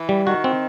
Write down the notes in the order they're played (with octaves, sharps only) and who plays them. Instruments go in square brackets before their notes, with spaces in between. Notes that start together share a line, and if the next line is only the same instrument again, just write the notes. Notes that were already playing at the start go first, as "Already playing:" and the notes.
Already playing: [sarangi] E3
[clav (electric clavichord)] G3
[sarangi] D#3 [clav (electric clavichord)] F#4
[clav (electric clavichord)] C4